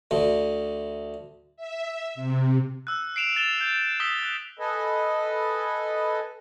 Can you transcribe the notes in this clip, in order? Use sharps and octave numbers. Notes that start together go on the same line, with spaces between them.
D2 D3
E5
C3
E6 F#6
C7 D7 E7 F7
A6 E7 F7 G7
G6
D#6 E6 B6 G7
F#6
A4 B4 D#5 G#5